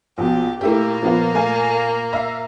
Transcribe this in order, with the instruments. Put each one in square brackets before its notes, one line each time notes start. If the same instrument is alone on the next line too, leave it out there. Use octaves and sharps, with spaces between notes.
[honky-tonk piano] A#1 B2 [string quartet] G4
[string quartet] A#2 A#3 [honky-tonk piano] A3 E4 G4
[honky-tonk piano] F3 B3 F4
A3 F5 G#5
E5 F5 A#5